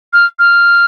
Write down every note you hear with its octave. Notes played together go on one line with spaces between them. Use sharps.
F6
F6